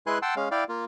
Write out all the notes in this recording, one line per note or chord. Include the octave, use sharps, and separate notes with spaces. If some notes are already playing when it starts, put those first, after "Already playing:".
G#3 E4 B4 G#5 C6 F#6
F#5 G5 A5 C6 E6
G#3 C#4 F5
E4 D5 F5 G5
A#3 F4